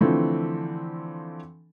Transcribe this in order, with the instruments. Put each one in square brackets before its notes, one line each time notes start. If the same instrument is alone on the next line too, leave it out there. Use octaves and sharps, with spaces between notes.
[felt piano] D3 E3 F3 A3 C4 A4